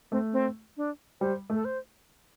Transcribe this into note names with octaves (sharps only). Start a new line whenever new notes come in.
A3 C4
C4
D4
G3 C5
A3 A4
C5